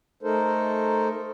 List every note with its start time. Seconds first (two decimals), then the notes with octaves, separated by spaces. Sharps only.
0.23 A3 D#4 A4 A#4 C5